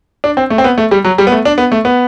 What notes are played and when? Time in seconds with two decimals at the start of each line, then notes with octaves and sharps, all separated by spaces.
0.24 D4
0.37 C4
0.50 A3
0.58 C4
0.64 B3
0.78 A3
0.91 G3
1.04 F#3
1.18 G3
1.27 B3
1.32 A3
1.45 D4
1.58 B3
1.72 A3
1.85 B3